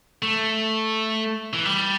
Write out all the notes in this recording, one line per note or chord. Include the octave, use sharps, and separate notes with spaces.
A3
E3
G3